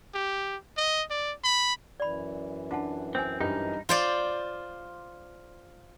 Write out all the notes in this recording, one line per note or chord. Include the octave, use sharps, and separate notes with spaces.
G4
D#5
D5
B5
F#2 E3 D5 B5
D4 F4 F#5 A5
C4 C5 G#5
G2 G3 D#4 D#5
F4 C5 D5